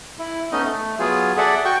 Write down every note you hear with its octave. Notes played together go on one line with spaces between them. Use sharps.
E4
A3 B3 C#4 D#4 D#5
A3
F#3 B3 F4 G#4
G#4 A4 D5 E5 F#5
F#4 G5 C#6